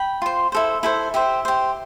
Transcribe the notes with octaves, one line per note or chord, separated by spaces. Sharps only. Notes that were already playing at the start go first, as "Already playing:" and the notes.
Already playing: G5 B5
F4 C5
E4 A4 C5
E4 A4 C5
G4 C5 E5
G4 C5